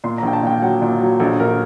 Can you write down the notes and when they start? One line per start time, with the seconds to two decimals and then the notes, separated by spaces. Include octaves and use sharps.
0.04 A#2 C6
0.18 A#5
0.23 A#1 G5
0.33 A5
0.43 A#2 G5
0.62 F#3 F#5
0.82 A#2
1.01 F#3
1.20 A#1 A4
1.40 A#1 A#4